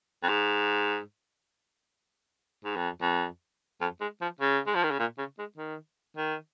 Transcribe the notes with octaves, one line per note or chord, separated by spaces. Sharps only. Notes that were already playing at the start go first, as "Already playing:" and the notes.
F2
G#2
G#2
F2
F2
F2
G#3
F3
C#3
G#3
F3
D#3
C#3
A#2
C#3
G#3
D#3
D#3